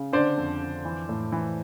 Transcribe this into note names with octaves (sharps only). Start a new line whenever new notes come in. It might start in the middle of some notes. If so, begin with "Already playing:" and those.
Already playing: C#3
D3 C5 D5
F2
D3
E3
A2
E3